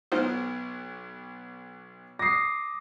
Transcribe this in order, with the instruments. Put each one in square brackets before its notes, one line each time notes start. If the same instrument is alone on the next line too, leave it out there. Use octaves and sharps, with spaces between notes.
[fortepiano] B1 B3 F6 [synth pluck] D#4 F4 C5
[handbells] D6 D#6 [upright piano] A#6 C7